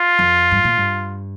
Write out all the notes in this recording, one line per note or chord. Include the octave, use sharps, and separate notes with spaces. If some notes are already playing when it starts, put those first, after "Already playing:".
Already playing: F4
F2
G2
A#2
G2